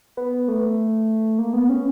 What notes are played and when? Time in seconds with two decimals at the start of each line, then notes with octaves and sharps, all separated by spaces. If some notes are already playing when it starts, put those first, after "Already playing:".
0.17 B3
0.48 A3
1.39 A#3
1.53 B3
1.69 C#4